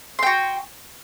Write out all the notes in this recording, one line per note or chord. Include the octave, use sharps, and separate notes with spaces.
F#4 G5 C6